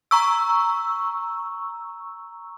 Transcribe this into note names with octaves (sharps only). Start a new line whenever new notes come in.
A#5 C#6 E6